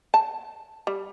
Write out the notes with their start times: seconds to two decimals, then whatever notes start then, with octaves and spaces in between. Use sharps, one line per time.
0.14 A5
0.87 G3